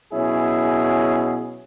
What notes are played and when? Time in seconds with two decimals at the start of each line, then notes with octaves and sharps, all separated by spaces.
0.13 B2 F#3 C#4 E4 G#4